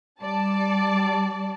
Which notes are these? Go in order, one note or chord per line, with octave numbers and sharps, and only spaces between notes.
G3 D5 A5